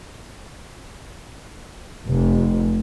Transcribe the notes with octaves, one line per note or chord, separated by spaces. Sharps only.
F1